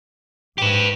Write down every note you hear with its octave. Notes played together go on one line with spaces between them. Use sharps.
G#2 G4 B4